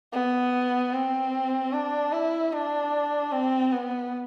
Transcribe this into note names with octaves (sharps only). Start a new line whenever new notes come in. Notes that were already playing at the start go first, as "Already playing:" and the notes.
B3
C4
D4
E4
D4
C4
B3